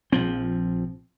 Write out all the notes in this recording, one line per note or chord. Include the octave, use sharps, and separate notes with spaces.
A#1 F3 C4